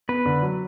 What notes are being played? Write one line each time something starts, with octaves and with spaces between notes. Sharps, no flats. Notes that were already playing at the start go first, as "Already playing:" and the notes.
B3 B4
D3
F#3